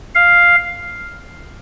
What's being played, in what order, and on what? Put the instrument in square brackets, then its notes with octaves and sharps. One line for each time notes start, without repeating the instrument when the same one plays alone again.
[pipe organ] F5